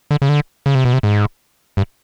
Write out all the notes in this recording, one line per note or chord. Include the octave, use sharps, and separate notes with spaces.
D3
C#3
D3
C#3
C3
B2
C3
G#2
G2